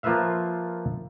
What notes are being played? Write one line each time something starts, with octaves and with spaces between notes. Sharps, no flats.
F3 A#3 F4 B4 E5 F5